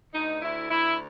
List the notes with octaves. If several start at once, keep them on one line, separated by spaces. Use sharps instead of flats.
D2 D#4
D2 E4
D2 E4